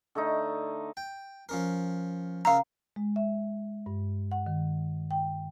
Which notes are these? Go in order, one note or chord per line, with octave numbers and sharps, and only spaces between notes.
D3 A3 D#4
G5
F3 C#4 A#4
C#3 A#4 E5 F5 A#5
G#3
E5
G2
F#5
D#3
G5